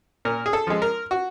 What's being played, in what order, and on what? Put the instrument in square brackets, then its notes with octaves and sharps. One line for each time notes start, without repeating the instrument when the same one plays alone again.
[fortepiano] A#2 A#4
G#4
A4
F3 G#3
A#4
F#4